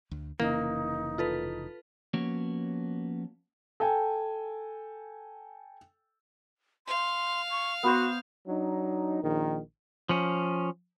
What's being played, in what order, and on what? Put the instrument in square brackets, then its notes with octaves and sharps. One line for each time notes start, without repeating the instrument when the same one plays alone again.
[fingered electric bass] D2
[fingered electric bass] F1 C#3 E3 [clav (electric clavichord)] A#3 [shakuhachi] D#4
[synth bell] F4 A4 B4
[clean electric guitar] F3 A#3 B3 C#4 F#4 C#5
[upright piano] A4 G5 G#5
[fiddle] F5 [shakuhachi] C6
[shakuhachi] C#6
[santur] B3 C5 [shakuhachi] F#4
[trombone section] F#3 D4 D#4
A#1 D#3
[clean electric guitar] F3 C#4